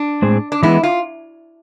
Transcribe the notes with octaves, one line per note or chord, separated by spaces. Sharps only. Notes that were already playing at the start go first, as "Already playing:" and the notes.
Already playing: D4
A2 G#3 C4 G#4 C5
D4
E3 G#3 B3 E4
F4